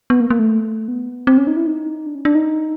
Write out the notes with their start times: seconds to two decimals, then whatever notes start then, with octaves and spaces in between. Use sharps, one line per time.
0.10 B3
0.20 A#3
0.30 A#3
0.39 A3
0.88 B3
1.27 C4
1.38 C#4
1.47 D#4
1.57 E4
1.67 D#4
2.06 D4
2.15 C#4
2.25 D4
2.35 D#4